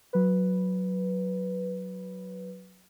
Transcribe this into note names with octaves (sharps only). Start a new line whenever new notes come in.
F#3 B4